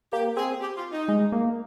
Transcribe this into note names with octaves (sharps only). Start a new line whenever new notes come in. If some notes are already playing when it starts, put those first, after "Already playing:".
A#3 G4
C4 G#4
G4
F4
D#4
G#3
A#3